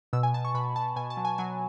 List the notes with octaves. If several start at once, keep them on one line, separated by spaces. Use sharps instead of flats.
B2 E6
G#5
B2 A5
C#6
B2 B5
B2 A5
B2 G#5
A5
F#3
G#5
F#3 G#5